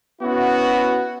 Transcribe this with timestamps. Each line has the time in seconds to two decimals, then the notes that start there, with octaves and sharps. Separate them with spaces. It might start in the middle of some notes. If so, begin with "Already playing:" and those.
0.22 B3 C#4 E4 F#4